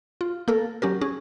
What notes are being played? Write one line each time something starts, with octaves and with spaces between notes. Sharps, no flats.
F4
A#3 A4 A#4
F#3 C#4 G4 A#4
C#4 G#4